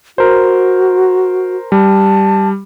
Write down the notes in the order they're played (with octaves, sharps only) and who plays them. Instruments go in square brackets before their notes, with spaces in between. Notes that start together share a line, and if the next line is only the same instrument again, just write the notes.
[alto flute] F#4 [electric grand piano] A#4 C5
[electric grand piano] G3 [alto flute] A5